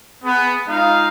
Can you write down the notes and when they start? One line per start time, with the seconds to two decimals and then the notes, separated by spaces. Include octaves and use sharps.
0.24 B3 G#4
0.67 G#3 D#4 F4 F5